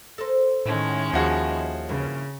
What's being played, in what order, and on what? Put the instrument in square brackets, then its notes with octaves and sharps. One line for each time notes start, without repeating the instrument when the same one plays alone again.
[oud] A4 A#4 C5
[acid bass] A2 [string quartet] D#3 G#3 C#4
[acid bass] D#2 [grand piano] F3 F#4 G#4 [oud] E4
[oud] G2 E3 A#3 [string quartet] C#3